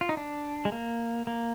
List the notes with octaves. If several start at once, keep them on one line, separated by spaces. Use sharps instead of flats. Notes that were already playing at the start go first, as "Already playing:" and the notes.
F4
D#4
D4
G#3
A#3
A#3